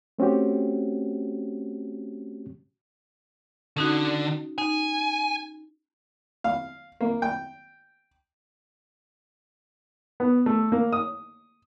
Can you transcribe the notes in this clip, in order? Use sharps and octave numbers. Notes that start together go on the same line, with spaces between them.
A3 C4 C#4 F#4 G4
D3 C#4 D#4 F#4
D#4 G#5
F5
A#3
G5
B3
A3
A#3
D#6